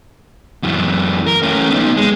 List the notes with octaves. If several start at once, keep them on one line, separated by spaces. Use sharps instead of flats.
F#2 E3
A#4
A3 C#4
B3 D#4
G#3